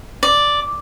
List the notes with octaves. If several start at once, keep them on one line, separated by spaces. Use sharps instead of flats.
D5